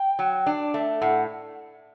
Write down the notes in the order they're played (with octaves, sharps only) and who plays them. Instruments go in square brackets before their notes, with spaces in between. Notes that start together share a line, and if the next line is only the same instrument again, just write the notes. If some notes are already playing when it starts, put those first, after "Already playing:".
Already playing: [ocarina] G5
[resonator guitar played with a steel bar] F#3
D4
A3
[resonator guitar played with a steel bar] A2 [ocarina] F#5